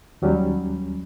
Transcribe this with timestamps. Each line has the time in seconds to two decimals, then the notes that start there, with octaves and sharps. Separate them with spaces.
0.22 D#2 F#3 G3 C#4